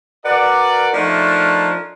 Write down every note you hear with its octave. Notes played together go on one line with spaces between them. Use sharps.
F#4 A#4 B4 D5
F3 A3 D4 D#4 A#4 C#5